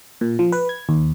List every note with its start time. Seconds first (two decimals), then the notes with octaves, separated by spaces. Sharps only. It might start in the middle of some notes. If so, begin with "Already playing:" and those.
0.21 A#2
0.39 F3
0.52 B4
0.69 G#6
0.89 D#2